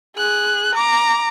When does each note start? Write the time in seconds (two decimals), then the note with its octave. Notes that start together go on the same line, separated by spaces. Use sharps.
0.17 G#4 F#6
0.75 A#5 D6